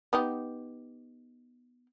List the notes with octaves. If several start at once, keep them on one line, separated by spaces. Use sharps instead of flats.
B3 D#4 G4